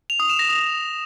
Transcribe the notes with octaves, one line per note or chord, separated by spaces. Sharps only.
F7
D#6
E7
A#6
D#6